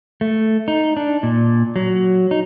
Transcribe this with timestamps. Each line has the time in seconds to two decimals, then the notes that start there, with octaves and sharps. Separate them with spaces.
0.21 A3
0.68 D#4
0.97 D4
1.23 A#2
1.76 F#3
2.31 D#4